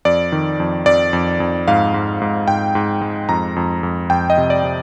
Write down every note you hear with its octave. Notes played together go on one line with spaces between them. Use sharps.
F2 D5
D#3
F2
F2 D5
F2
F2
G#2 F5
G#2
G#2
G#2 G5
G#2
G#3
F2 A#5
F2
F2
F2 G5
D#5
C3
D5
C3